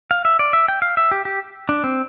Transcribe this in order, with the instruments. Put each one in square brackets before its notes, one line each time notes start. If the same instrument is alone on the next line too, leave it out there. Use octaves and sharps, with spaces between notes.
[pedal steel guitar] F5
E5
D5
E5
G5
F5
E5
G4
G4
D4
C4